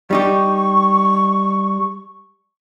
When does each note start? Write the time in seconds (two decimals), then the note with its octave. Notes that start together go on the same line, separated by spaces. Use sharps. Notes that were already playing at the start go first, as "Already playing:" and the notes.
0.11 G3 D#4 G4 C#6